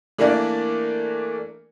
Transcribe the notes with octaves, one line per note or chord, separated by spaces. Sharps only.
E3 A3 A#3 D4 A#4 D5